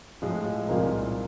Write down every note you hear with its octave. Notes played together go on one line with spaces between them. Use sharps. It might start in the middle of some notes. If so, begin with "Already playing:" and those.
A2 F3 G#3
C2 A#2 F3 A#3 D#4